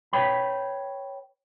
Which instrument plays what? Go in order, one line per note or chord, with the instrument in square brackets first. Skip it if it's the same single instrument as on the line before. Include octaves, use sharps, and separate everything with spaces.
[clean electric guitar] B4 C#5 G5 B5